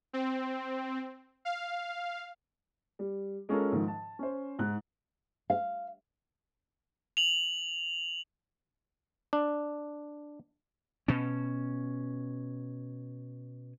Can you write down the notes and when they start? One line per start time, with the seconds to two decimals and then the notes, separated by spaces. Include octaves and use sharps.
0.13 C4
1.45 F5
2.99 G3
3.49 G#3 C#4 F4 A4 A#4
3.72 G#2 D#3 F3
3.88 A5
4.19 C#4 C5
4.59 G#2 F#6
5.50 F5
7.17 F7 F#7
9.33 D4
11.08 B2 C#4